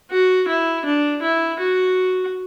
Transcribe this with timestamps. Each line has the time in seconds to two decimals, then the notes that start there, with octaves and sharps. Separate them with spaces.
0.11 F#4
0.48 E4
0.85 D4
1.22 E4
1.60 F#4